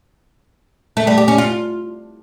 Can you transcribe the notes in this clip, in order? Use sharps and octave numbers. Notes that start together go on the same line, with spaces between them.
A3
G3
G4
C#4
F4